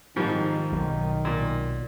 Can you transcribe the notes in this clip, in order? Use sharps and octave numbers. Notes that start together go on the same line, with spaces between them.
G#2 D#3 F3 G3
B1 B2 F#3
A#2